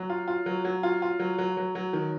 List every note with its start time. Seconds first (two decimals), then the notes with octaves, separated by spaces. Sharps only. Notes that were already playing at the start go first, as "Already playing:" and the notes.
Already playing: F#3
0.10 F4
0.28 F4
0.46 F#3
0.65 F#3
0.83 F4
1.02 F4
1.19 F#3
1.38 F#3
1.57 F#3
1.75 F#3
1.93 D#3